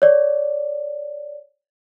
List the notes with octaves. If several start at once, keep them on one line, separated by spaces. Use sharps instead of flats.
C#5 D5